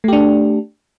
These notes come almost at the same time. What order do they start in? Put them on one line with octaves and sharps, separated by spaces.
A3 G4 D4